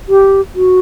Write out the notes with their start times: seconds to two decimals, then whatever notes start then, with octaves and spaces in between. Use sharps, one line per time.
0.09 G4
0.55 F#4